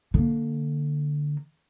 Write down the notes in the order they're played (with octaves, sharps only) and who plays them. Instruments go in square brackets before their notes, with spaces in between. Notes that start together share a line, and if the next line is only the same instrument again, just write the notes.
[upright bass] D3 A#3